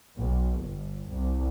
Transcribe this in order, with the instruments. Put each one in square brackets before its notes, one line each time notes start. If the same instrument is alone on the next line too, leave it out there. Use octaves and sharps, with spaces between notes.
[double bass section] B1
G1
C2